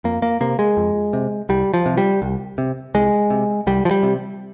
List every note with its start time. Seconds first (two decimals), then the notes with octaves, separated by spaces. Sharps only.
0.04 F2 A#3
0.22 A#3
0.41 C3 A#3
0.59 G#3
0.77 F2
1.13 C3
1.49 C2 G3
1.74 F3
1.86 C3
1.98 G3
2.22 C2
2.58 C3
2.94 C2 G#3
3.30 C3
3.67 C2 G3
3.85 F3
3.91 G3
4.03 C3